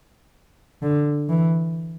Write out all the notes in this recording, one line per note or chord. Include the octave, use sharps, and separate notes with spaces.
D3
E3